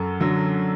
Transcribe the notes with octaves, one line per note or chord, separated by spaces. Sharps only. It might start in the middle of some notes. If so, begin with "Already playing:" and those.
Already playing: F#2 A4
D3 F#3